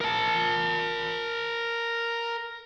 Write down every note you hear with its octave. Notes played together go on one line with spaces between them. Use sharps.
A#4 A5